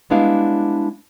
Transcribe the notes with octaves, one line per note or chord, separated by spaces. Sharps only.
G3 G#3 B3 D4 E4 F5